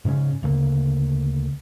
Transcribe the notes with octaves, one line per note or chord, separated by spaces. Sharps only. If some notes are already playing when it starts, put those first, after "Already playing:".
G#2 C#3 G#3 C#4
D2 C#3 A3 A#3